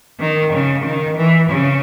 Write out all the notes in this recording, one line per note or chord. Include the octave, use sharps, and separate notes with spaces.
D#3
C#3
D#3
E3
C#3